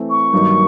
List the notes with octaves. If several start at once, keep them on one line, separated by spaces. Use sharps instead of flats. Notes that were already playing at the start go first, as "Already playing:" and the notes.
Already playing: E3 A3 C4
C#6
G2 D#3 F#3 A#3 D#4